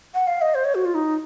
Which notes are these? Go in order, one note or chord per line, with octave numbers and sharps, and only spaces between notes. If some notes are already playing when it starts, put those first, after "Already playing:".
F#5
F5
D#5
C5
C#5
F#4
F4
D#4